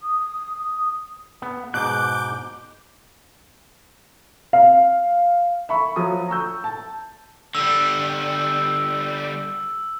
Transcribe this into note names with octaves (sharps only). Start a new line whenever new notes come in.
D#6
B3
G#2 B2 D6 F#6 G6
F5
E5 B5 C#6
F3 F#3 D#6
A#5 C#6 E6 G6
A5
D3 G3 E6